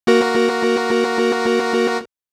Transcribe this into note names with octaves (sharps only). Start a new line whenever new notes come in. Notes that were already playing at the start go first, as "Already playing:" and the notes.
A#3 F#4 A#4